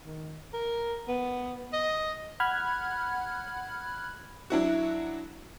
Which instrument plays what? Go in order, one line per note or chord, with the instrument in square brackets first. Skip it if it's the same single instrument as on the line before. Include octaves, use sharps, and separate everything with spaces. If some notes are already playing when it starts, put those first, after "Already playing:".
[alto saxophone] D#3
A#4
B3
D#5
[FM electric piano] F#5 B5 F6 F#6 G#6
[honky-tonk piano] F#3 D4 E4 F#4